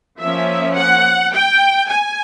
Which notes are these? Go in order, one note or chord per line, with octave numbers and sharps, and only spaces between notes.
F3 A#3 C#4 E5
F#5
G5
G#5